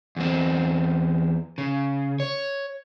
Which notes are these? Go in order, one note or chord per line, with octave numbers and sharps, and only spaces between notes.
E2 C4
C#3
C#5